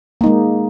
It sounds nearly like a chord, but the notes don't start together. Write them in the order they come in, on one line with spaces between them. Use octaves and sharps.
A#3 D#4 G#3